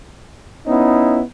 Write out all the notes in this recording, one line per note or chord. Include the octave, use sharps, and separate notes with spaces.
B3 C#4 D#4 E4